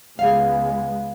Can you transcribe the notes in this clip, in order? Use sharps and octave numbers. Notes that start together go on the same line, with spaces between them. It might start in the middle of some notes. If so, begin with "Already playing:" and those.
C#2 G#3 B3 G#4 F5